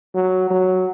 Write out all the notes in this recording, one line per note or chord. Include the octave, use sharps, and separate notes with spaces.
F#3
F#3